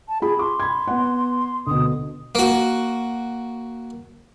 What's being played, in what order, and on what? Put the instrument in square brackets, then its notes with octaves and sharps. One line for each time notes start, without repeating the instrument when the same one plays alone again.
[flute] A5
[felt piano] F4 B5 [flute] G#4
[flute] C6 [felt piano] D6
[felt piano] B5 G#6
B3 F#5
[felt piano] D2 B2 [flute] D#6
[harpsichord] A#3 F#4